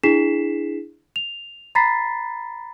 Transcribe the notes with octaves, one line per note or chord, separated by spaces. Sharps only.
D4 E4 G#4 B6 C7 E7
F7
A#5 B5 A6 B6 C7